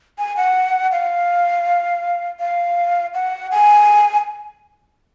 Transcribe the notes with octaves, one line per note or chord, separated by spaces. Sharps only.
G#5
F#5
F5
F5
F#5
G#5